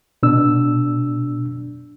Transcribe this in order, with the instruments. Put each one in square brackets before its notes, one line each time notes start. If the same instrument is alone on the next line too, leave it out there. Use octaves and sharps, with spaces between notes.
[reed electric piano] B2 D4 E6